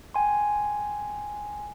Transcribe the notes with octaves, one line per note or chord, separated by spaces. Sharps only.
G5 G#5 C6